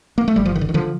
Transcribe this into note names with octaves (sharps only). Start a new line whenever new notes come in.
A#3
A3
G1 G3
F3
D#3
D3
D#3
D3 F3